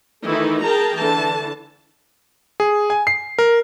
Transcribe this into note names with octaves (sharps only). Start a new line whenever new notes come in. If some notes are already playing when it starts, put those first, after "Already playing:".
D#3 E3 A3 D#4 E4
G#4 A#4 G5 A5 A#5
D3 E3 A5
G#4
G#5
C7
A#4